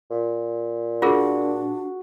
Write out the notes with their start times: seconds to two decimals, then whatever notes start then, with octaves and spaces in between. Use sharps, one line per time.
0.10 A#2
1.02 D4 F4 F#4 G#4 A#4